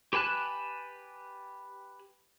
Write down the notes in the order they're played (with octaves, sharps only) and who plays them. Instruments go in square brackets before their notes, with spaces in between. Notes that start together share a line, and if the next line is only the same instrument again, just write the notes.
[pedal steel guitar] G4 B4 G#5 A5 F#6